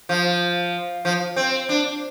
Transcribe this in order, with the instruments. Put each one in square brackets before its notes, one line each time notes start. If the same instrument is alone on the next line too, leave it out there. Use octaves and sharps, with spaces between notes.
[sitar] F3
F3
C4
D4